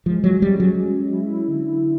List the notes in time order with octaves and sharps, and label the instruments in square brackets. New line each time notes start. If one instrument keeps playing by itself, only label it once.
[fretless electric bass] F3 [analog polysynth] G#3
[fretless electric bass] F#3
[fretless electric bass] G3 [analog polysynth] C#4
[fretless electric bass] F#3
[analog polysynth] G#3
E4
D3
D3